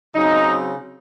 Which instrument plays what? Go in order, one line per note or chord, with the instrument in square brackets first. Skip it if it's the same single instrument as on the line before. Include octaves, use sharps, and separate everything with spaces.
[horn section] C#3 F#3 C4 D#4